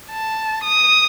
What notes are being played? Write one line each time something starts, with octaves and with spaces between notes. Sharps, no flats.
A5
D#6